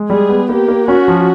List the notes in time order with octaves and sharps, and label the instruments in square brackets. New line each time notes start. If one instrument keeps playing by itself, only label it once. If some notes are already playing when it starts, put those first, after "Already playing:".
Already playing: [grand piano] G#3
[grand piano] G3 [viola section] G#4
[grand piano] B3
[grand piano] A#3 [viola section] G4
[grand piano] A#3
[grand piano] C#4 [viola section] F#4
[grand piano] F3